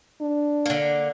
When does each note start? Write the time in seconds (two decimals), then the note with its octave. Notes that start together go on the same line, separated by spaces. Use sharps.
0.21 D4
0.66 D3 A#3